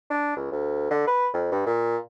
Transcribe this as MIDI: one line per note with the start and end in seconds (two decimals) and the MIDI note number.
0.10 0.36 62
0.37 0.48 37
0.52 0.90 38
0.91 1.03 50
1.07 1.29 71
1.34 1.48 41
1.52 1.64 43
1.66 1.97 46